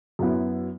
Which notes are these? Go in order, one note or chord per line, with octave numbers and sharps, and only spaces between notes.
F#2 F#3 B3 E4